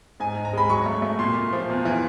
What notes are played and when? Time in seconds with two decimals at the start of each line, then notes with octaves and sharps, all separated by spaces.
0.20 G#2 G#5
0.36 G#2
0.45 A#5
0.53 G#3 B5
0.70 F#3 C#6
0.86 A3
1.02 A3
1.19 A#2 C6
1.35 A#2
1.53 F3
1.69 E2
1.85 E3